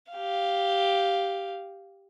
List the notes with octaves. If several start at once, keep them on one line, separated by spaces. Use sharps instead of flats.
G4 F5